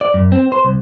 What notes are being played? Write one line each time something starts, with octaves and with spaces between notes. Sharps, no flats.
D5
F#2
C4
C5
C2